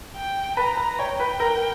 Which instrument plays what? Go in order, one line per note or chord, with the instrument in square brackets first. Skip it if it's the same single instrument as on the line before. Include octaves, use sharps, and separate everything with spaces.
[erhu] G5
[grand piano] B4 B5 [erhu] A#5
[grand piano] B4 B5
[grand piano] C#5 C#6 [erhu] G5
[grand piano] B4 B5
A#4 A#5